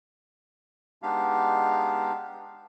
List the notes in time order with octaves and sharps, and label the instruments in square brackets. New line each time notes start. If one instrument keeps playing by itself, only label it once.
[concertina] G#3 B3 D4 D#4 G4 F5